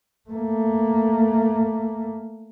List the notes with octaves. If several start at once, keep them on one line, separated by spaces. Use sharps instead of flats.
A3 A#3